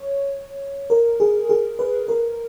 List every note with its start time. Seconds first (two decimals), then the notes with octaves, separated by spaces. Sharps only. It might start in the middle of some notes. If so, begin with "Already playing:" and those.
Already playing: C#5
0.90 A#4
1.20 G#4
1.49 G#4
1.79 B4
2.08 A#4